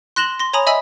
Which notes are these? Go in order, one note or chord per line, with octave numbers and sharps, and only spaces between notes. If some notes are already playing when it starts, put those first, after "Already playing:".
C6 F#6 A#6 E7 F#7 G7
C6 A#6
C#5 G#5 A#5 B5 D#6
D#5 E5 G#5 B5 E6